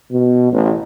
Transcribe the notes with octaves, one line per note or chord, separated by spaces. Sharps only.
B2
A1